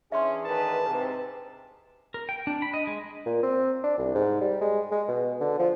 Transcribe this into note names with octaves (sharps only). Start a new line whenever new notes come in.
E3 C#4 D4 G#4 E5 C6
A2 D#3 B4 A5
G#2 C3 B4
A#4
G5
D4
B5
D#5
G#3
A#2
C4
D4
C2
G#2
G3
G#3
G#3
B2
D3
F3